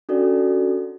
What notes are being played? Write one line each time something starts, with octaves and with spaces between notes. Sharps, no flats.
C#4 D4 F#4 A4 D5